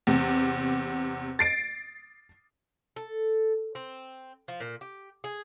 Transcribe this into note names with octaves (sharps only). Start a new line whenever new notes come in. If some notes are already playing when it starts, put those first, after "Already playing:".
E2 C3
A6 C7 D7
A4
C4
F3
A#2
G4
G#4